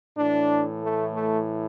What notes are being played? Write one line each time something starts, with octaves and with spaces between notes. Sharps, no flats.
A2 E3 D4
A3
A3